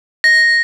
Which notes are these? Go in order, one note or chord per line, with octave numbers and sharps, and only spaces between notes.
A#6